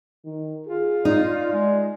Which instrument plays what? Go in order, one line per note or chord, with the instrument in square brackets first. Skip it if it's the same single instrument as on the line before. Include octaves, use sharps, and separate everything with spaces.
[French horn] D#3
[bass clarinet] F4 [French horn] G#4
[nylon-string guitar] D#4 [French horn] D5
[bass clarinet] G#3